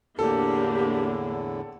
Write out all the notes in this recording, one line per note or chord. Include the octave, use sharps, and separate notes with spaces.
E2 A2 D3 A#3 D4 G4 A4